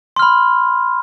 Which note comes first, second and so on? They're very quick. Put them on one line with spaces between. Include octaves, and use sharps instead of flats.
C6 F6 B5